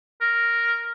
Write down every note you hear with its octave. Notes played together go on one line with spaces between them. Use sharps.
A#4